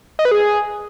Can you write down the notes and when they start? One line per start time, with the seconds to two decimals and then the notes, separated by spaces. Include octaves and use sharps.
0.19 D#5
0.25 B4
0.31 G#4